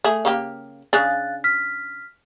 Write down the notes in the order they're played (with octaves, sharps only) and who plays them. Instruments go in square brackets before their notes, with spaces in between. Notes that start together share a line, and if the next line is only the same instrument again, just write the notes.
[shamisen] A3 G#4
C#3 A#3 G4
[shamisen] C#3 D4 G#4 [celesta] F5 F#6 A6
[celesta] F6 B6